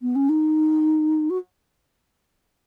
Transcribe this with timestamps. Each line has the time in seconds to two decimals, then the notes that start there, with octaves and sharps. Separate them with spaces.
0.02 B3
0.15 C#4
0.29 D#4
1.30 F#4